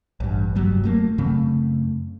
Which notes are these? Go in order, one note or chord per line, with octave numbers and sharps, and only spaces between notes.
A1 G2
F1 G2 F#3 G3
F#3 A3 A#3
F#2 C#3 A3 C4